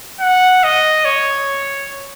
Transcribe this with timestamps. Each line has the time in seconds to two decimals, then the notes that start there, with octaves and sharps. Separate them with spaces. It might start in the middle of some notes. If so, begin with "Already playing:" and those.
0.21 F#5
0.64 D#5
1.05 C#5